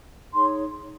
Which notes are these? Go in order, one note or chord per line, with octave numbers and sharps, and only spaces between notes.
D#4 G#4 C#5 C6